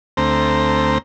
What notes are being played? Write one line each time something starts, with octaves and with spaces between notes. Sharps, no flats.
D2 A3 C4 C5 A#5